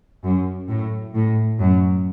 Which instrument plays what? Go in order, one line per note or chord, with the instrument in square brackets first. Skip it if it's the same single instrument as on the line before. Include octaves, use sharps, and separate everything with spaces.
[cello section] F#2
A2
A2
F#2